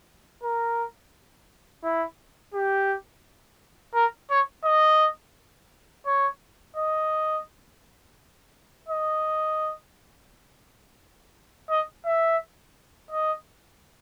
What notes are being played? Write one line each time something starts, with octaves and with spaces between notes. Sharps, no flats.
A#4
E4
G4
A#4
C#5
D#5
C#5
D#5
D#5
D#5
E5
D#5